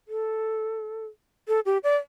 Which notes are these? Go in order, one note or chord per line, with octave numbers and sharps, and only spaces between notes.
A4
A4
G4
D5